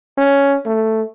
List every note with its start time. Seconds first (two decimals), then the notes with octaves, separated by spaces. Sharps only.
0.17 C#4
0.66 A3